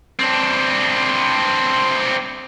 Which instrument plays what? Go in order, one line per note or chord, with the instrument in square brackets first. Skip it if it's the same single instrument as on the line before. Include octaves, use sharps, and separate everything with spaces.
[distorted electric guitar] C4 D4